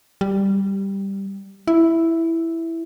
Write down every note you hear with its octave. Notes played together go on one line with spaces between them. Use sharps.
G3
E4